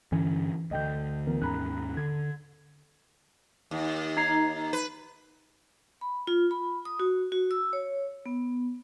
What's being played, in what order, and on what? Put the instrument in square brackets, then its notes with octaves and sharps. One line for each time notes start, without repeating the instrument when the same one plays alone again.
[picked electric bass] G2 D3 C#4 [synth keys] E3
[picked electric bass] D2 D3 [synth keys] D#5 G5 G6
[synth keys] E3 B3 A#4
[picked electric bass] D#2 G#2 C#4 [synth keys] A#5 B5 F#6
[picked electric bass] D3 [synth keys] G#6
[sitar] D#2
[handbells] D#4 A#5 C7
[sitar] B4
[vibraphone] B5
F4
B5
D#6
F#4
F#4
E6
C#5
B3